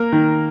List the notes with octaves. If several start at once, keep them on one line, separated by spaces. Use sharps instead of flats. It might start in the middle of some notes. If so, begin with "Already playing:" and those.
Already playing: A#3 A#4
D#3